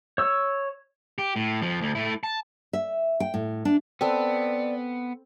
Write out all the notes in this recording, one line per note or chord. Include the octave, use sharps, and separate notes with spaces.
C#5 E6
G4
A2
F2 F3
D2
A3 E4
A5
E5
G5
A2
D4
B3 C4 A4 B4 D5